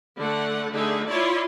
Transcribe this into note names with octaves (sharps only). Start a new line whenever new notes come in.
D3 A3 F#5
D3 A3 D#4 G#4 E5
E4 F4 C#5 D5 C6